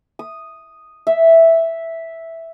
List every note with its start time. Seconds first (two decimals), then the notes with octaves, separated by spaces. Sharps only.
0.19 D#6
1.07 E5